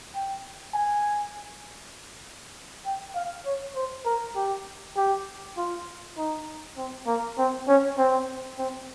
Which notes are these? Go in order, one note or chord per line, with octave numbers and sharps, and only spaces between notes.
G5
G#5
G5
F5
C#5
C5
A#4
G4
G4
F4
D#4
C4
A#3
C4
C#4
C4
C4